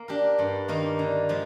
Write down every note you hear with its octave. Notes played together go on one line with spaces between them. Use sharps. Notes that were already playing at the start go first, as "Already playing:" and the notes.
Already playing: A#3
D4 G4 A#4
G2
D#3 A#3 D#4 A#4
D3
F3 G#3